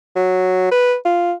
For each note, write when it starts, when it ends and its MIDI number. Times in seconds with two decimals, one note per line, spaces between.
0.16 0.68 54
0.71 0.95 71
1.05 1.33 65